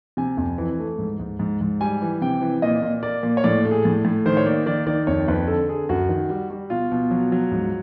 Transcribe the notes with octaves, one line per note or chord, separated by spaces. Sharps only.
C3 G#5
F2
E3
A3
G#2
G#2
G#2
G#2
G3 G#5
E3
C3 G5
E3
A#2 D#5
A#2
A#3 D5
A#2
C#5
A2 D5
A3
G#4
A2
A2
D#3 C5
C#5
A#3 D5
D#3 D5
D#3 D5
F2 C#5
F2 B4
D3 A4
D3 G#4
F#2 F#4
D#3
G3
G3
B2 F4
B2
F#3
F#3
G#2